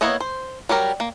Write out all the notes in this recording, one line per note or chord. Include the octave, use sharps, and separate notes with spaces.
A#3 B3 E4 C#5 D#5
C5
F#3 G3 G4 A#4
A#3